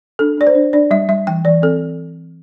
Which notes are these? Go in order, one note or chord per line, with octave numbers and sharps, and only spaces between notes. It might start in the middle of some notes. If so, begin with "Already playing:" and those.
D4 A4
D4 D5
C5
D4
D4 D5
G3 E5
G3 E5
E3 G5
E3 D5
C4 A4